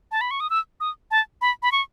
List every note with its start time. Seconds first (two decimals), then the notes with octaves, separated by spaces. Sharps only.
0.12 A5
0.21 B5
0.31 C#6
0.40 D#6
0.50 E6
0.80 D#6
1.11 A5
1.41 B5
1.63 B5
1.72 C#6